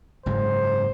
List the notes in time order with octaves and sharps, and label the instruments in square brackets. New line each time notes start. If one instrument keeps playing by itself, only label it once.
[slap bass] F#1 G#2 G#3 [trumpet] C5